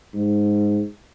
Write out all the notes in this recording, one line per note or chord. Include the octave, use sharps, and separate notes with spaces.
G#2